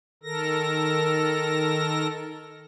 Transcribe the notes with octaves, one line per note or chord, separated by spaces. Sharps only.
D#3 A4 A#4 A#6